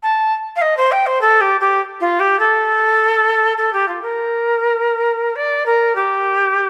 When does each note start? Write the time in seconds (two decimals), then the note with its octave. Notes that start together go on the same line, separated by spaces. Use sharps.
0.02 A5
0.55 F5
0.61 D#5
0.76 C5
0.91 G5
1.06 C5
1.21 A4
1.40 G4
1.60 G4
2.00 F4
2.19 G4
2.39 A4
3.57 A4
3.72 G4
3.87 F4
4.02 A#4
5.35 D5
5.65 A#4
5.95 G4